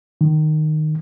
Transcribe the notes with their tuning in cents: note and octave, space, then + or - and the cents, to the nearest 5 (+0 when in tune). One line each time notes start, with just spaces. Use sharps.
D#3 -15